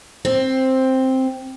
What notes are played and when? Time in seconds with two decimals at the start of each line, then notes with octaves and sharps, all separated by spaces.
0.25 C4